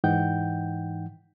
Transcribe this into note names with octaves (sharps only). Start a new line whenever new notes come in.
G#2 E3 D#4 F#5 G5 G6